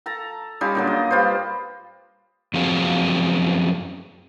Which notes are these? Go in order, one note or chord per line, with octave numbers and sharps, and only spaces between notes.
A4 A5 A#5
G3 C#4 D#4 F4
A#2 D3 F#3
D#5
G3 F4 B4 C5
F#2 F3 C4 F#4 G#4 F5